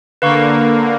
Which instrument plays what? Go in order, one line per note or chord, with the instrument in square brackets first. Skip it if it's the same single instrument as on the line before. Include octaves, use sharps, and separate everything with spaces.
[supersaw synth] D3 A#3 [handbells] B4 F5 C#6